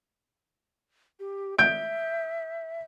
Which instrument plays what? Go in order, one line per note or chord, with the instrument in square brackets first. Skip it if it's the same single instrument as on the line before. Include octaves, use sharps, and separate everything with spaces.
[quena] G4
[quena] E5 [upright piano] G6 D7